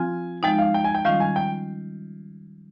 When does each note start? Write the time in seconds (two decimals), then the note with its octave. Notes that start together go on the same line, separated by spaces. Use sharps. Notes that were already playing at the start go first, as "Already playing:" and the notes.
Already playing: F3 C4 F4 G#5
0.43 F3 G#3 D#4 G5
0.59 F5
0.74 G5
0.84 G#5
0.95 G5
1.05 D#3 G3 C#4 F4 F5
1.20 G#5
1.36 G5